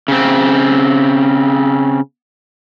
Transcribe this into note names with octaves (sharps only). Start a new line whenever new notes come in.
C#3 C4